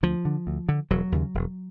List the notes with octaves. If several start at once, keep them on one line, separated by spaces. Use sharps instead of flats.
D2 F3
D3
D2
D3
E1 F#3
D#2 C#3
E1